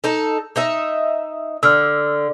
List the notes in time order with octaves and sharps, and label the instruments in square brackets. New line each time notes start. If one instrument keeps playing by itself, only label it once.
[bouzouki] D#4 A4
D#4 D#5 E5
[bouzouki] D3 [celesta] E6 F6